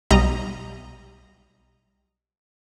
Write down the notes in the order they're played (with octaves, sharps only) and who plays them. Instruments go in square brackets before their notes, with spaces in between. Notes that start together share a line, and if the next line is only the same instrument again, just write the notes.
[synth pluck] B1 G3 D#5 A#5